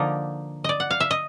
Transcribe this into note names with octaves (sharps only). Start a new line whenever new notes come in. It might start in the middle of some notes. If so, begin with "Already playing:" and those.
Already playing: D3 F3 A#3 D#4 D5
D5 D#5
F#5
F5
E5
D#5